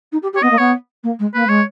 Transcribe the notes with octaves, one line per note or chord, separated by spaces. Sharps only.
D#4
G4
G4
C#5
B3 D#5
A#3
B3 C#5
A#3
G#3
A#3 B4
G#3 C#5